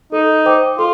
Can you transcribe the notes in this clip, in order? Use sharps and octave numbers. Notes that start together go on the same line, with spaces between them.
D#4 A4
C5 G5 D6
F4 A4